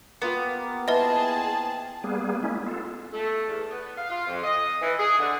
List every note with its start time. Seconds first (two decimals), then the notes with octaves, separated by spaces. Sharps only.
0.22 A#3 B3 F4 G4
0.88 E4 G#4 B4 C5 D#5 E5 G5 A5
2.04 G3 A#3 B3 G#4
2.43 G#3 A#3 C#4 E4
2.66 B3 F4 A4
3.13 A3
3.48 E2
3.70 B3
3.97 F5
4.10 F4
4.27 F2
4.43 D#5
4.81 E3
4.99 G#4
5.18 D3